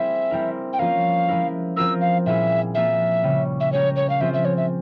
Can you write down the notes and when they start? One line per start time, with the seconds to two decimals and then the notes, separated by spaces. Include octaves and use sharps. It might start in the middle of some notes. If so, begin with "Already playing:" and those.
Already playing: G3 A#3 C4 E4 G#4 E5
0.31 G3 C4 E4 A#4
0.73 G5
0.79 F3 A#3 C#4 F4 A#4 F5
1.28 F3 G#3 E4 A#4
1.77 F3 C4 F4 A#4 E6
2.01 F5
2.26 A#2 G3 A#3 E4 G#4 E5
2.75 F3 A#3 F4 A#4 E5
3.23 C#3 G3 C#4
3.60 E5
3.72 G#3 C#4 G4 A#4 C#5
3.96 C#5
4.10 F5
4.21 F3 C4 F4 G#4 E5
4.34 E5
4.45 C#5
4.57 E5